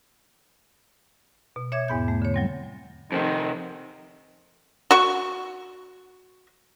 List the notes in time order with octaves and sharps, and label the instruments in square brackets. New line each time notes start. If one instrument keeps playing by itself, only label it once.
[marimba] B2
C#5 E5 D6 G#6
E2 G#2 B3 G6
A3
D3 C#5
F#3 G3 C4
[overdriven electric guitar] F2 C3 [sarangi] D#3
[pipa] F#4 C#6